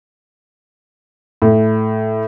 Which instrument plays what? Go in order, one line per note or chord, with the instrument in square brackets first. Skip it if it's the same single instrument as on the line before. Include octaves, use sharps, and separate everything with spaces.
[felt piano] A2